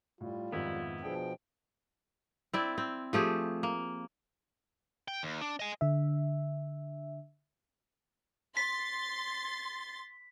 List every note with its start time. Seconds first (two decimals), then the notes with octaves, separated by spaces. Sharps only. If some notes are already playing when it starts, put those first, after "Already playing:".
0.21 A2 G3 F4
0.52 F2 G#2 D#3 B3 E4
1.03 B2 F3 D4 G#4 G5
2.53 C4 E4 D5
2.78 C4
3.13 F3 A3 G4 G#4
3.63 A#3
5.08 G5
5.23 D#2
5.41 D4
5.60 D#5 G#5
5.81 D3 E5
8.57 C6 A6 B6